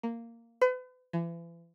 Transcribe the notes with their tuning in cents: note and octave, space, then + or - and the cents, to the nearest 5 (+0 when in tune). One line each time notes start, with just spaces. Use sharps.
A#3 -10
B4 +40
E3 +40